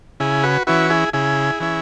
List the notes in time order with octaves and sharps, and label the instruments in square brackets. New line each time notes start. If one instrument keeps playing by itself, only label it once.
[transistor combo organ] C#3 E4 G#4
F#4 B4
E3 C#4 E4 F#4 B4
E4 G#4
C#3 E4 G#4
E3 C#4 E4